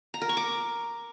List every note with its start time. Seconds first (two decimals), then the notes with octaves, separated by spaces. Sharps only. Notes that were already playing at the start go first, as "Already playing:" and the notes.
0.14 A#5
0.22 A#4
0.29 C#6
0.37 D6